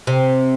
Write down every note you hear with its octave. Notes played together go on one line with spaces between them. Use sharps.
C3